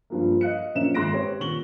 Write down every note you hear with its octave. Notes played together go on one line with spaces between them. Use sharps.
G2 F3 A#3
D#5 F5 F#6 C#7
A#1 F#2 A#3 C#4 E5 E7
G#1 G#3 C6 F#6 A#6 D7
C4 G4 B4 C#5
D#1 C#6 F#7 G7